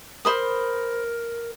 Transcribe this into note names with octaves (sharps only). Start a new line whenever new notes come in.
A#4 C5 B5 D#6